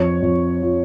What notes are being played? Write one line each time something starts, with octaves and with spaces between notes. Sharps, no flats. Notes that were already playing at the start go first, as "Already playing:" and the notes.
Already playing: F2 C#5
F2
F3